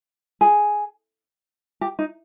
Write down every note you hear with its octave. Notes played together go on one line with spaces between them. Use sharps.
G#4
G4
D#4